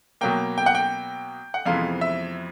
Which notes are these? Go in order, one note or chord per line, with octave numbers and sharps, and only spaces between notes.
B2 F#3 A#3 G5
G5
F#5
G5
F#5
F2 C3 E3 G#3 B3 F5
E5